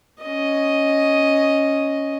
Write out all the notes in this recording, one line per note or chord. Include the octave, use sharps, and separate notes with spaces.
C#4 D#5